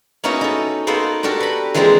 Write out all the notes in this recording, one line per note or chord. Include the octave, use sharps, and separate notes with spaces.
A#3 B3 C#4 D#4 E4 F#4
D#4 A4
A#3 B3 D#4 A4 C5 F#5
D4 F#4 G4 A4 A#4
B4 B5
E3 F3 G#3 A#3 C4 D4